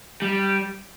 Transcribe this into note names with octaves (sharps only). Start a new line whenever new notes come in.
G3